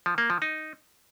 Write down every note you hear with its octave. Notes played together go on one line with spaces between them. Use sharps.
F3
A#3
F3
D#4